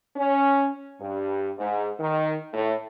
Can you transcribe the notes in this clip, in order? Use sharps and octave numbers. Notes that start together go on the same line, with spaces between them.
C#4
G2
G#2
D#3
A2